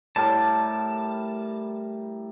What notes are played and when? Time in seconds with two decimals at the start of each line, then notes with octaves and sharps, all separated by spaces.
0.16 A2 G3 A#4 A5